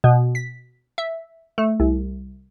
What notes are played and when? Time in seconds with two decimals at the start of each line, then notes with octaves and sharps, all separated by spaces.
0.04 B2
0.35 B6
0.98 E5
1.58 A3
1.80 C2